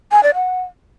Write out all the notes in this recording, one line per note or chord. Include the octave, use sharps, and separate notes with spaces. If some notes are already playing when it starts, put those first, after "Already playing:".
G#5
D5
F#5